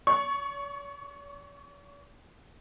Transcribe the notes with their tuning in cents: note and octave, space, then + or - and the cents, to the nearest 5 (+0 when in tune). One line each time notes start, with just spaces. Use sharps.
C#5 +45 C#6 +0